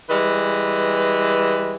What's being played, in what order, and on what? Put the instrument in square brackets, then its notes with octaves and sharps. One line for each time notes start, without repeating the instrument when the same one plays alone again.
[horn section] E3 G3 G#3 B4